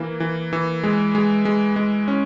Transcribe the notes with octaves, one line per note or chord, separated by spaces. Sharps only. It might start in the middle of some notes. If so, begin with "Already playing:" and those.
Already playing: E3 A#3
E3
E3
G#3
G#3
G#3
G#3
C#4